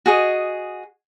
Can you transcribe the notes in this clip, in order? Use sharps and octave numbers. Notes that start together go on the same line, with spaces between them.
F#4 G#4 D#5